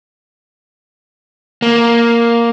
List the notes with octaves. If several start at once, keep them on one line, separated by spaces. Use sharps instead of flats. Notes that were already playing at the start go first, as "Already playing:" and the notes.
A#3